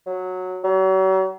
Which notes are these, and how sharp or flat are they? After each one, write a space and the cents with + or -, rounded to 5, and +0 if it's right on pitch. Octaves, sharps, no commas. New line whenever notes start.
F#3 -10
F#3 +40